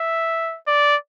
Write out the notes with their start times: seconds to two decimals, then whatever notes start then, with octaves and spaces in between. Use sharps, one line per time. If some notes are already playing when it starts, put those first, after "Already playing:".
Already playing: E5
0.67 D5